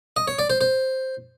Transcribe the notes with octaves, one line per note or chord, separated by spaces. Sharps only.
D#5
C#5
D5
C5
C5